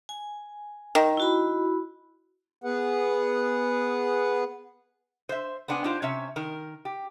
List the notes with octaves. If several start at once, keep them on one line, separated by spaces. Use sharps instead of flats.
G#5
D#3
E4 F#4 B5
B3 G#4 B4 F#5
C5 E5
B3 C4 D4 F#5 G#5
D4 D#4 F4 G4 C5
C3 C#4 C#5 E5
D#3 A#4
G4